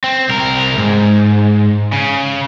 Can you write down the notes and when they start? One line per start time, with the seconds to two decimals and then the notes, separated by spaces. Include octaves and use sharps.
0.04 C4
0.29 C2 A#4
0.78 G#2
1.92 C#3